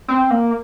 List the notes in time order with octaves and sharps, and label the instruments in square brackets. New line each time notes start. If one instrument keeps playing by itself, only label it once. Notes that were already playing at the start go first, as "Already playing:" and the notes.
[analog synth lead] C4
A#3